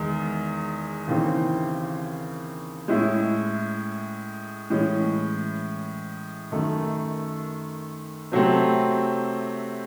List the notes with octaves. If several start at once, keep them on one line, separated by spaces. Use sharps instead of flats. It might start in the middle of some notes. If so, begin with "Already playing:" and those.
Already playing: E2 D#3 G#3
D#2 C#3 E3 C4
A2 G#3 C#4 E4
A2 E3 G#3 C#4
F#2 D#3 A3 D#4
C3 F#3 A3 C4